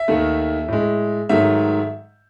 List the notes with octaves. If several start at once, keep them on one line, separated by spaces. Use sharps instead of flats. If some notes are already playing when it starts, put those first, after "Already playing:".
Already playing: E5
D#2 D#3 A3
A2 G#3
G#2 D#3 F#3 A3 E5